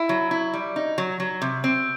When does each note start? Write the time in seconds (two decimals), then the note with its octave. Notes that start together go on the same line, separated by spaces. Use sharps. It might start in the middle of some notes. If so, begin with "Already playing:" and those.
Already playing: E4
0.09 F#3
0.31 E4
0.54 G3
0.76 D#4
0.98 F#3
1.20 F#3
1.42 C3
1.64 C4